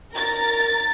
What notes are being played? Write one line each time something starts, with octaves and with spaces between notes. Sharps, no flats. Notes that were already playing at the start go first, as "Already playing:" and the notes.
A#4 A6